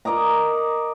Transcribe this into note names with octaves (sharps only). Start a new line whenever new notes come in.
A#4 D5 D#5 A#5